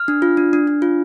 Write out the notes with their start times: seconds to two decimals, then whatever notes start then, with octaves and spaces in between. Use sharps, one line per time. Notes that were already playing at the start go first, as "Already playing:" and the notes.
Already playing: F6
0.08 D4
0.22 F4
0.37 D4
0.53 D4
0.67 D4
0.82 F4